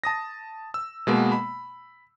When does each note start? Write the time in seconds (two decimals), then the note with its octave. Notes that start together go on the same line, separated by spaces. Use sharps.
0.04 A5 D#6 A#6
0.74 E6
1.07 B2 G#3 A#3 B3
1.32 B5